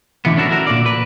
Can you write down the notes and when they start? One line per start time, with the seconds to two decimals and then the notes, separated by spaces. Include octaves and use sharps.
0.25 A2 D3 E3 B3
0.37 C#4 D4 E4 F#4 A4 A#4
0.49 E4 F#4 A#4
0.67 A#2 D3 D5
0.86 B4